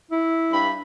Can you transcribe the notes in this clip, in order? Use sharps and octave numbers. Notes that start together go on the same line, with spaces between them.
E4
G2 B5